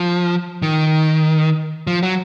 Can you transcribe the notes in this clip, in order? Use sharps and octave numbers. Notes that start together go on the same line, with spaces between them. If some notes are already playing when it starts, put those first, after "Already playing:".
Already playing: F3
D#3
F3
F#3